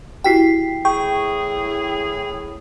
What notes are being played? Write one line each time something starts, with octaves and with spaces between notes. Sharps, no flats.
E4 F#4 G4 G5 B6 C7
A2 E3 G#4 G5 C#6